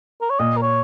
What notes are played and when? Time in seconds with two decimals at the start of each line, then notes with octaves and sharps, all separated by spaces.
0.21 A#4
0.30 C#5
0.39 A#2 D#5
0.57 A#4
0.62 C#5